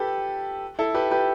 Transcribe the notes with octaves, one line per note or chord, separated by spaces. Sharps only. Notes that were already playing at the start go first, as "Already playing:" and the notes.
Already playing: G4 A4 B4
E4 A4
G4 B4
G4 B4